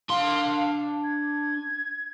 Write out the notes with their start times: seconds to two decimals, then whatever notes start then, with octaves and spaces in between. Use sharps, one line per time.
0.10 D4 F5 C6
1.04 G#6